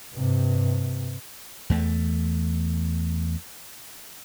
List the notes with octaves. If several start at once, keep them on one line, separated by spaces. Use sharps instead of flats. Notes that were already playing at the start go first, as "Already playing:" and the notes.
G2 C3
E2 A3